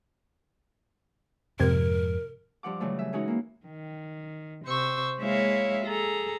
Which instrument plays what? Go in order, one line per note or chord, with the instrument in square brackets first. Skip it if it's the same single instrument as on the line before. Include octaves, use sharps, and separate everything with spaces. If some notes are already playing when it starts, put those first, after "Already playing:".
[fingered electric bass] F2 G#2 [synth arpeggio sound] C3 G#6 [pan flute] A#4
[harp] G2 F3 F#5 D6
C#3 E3 F#3 G3 A3
G#4 E5
E3 G#3 C#4 D#4 F#4
A#3 E4
[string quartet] D#3
C3 C5 C#6 E6
G#3 A#3 E4 C#5 E5 F5
G#4 A4 A#5